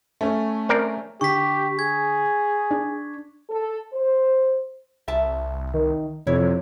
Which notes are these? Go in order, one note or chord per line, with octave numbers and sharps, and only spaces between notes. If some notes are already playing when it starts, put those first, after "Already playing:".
A3 C#4
C4 A#4 D5
D3 G4 C#6 B6
G#4 G#6
D4
A4
C5
C2 E5 A5
D#3
F2 C3 E4 C#5